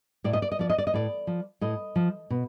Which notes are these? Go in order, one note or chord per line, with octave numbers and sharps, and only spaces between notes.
A2 D5
D#5
D5
D#5
F3 D5
D#5
D5
D#5
A2 D5
F3
A2 D#5
F3
B2